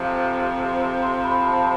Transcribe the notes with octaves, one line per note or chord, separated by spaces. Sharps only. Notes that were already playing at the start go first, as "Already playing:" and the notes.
Already playing: F2 C3 F3 D6
C6
B5
A5